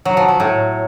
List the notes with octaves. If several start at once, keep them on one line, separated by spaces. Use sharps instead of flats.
F#3
F3
F#3
A2